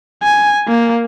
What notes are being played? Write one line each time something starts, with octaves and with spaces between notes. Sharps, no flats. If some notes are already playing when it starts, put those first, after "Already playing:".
G#5
A#3